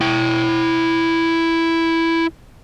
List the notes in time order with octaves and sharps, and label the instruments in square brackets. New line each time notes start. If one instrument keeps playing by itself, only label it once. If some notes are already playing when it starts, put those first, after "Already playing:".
[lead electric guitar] E4 G5